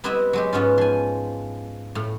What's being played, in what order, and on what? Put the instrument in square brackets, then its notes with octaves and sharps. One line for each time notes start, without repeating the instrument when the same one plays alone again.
[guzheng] G3 B3 C4 E4 D#5 E5
F#3 G#3 G4
G#2 B3 C#4 F4
F3 G#5
A2